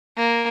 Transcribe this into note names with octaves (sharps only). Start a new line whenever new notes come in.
A#3